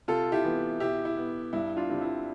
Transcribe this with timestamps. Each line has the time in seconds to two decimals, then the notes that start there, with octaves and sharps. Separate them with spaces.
0.08 C3 F4 A4
0.32 E4 G4
0.44 E3 B3
0.80 B2 E4 G4
1.05 E4
1.17 B3
1.53 G2 E4
1.76 D4 F4
1.89 D3 G3 C4
2.01 E4